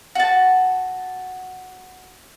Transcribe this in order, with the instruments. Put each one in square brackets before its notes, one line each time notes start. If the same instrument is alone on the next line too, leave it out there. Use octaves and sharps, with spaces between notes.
[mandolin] F#4 A5